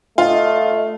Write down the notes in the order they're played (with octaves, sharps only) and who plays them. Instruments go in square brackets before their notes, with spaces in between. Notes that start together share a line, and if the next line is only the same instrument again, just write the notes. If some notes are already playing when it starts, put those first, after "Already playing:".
[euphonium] A3 [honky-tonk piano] F4 [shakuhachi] D#5